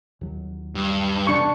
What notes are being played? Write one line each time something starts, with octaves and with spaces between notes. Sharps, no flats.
D#2 F#3
G2
E2 C3 D4 C#6